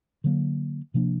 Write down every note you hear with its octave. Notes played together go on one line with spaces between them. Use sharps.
D3 F#3 A#3
C3 F3 A#3 D4